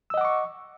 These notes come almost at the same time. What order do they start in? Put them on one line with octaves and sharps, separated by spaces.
E6 D#5 F#5 D6 C#6